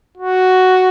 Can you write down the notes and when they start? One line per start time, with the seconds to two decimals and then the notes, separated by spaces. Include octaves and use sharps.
0.18 F#4